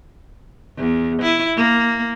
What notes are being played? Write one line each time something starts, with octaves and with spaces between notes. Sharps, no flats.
E2
E4
A#3